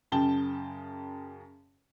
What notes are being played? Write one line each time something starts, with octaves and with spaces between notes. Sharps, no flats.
F#2 C#3 G5 A5 G7